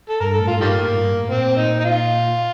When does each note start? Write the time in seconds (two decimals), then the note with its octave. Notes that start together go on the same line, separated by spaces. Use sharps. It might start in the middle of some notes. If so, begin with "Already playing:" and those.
0.09 A4
0.20 G2 A#4
0.34 A2 A4
0.47 F4
0.56 G2 D#3 G3 A#3
0.75 A2
0.93 G2
1.11 A2
1.29 A#2 C4
1.57 D#4
1.79 D#4
1.84 F4